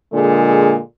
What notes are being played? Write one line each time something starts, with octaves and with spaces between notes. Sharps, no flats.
A#2 D3 G#3 G#4